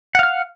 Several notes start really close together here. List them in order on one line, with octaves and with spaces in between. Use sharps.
F#5 F5 F6